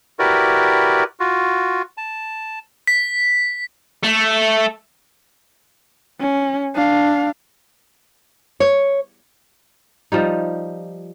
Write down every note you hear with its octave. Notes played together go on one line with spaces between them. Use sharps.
E4 F#4 G4 A#4 B4 D5
F4 F#4
A5
B6
A3
C#4
D4 F5
C#5
F3 G3 D#4